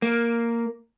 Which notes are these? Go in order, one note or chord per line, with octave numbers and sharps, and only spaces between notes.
A#3